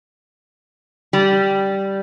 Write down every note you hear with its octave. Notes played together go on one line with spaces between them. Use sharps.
G3